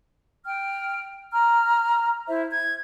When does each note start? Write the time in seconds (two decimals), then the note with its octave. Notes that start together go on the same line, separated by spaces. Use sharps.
0.46 G5 F6
1.33 A#5 F6
2.27 E4 C5 E5
2.51 G#6